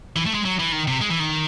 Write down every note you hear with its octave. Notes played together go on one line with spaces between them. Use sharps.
E3
A3
G#3
F#3
E3
D#3
C3
G#3
E3
D#3